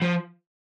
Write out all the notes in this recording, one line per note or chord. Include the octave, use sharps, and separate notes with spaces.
F3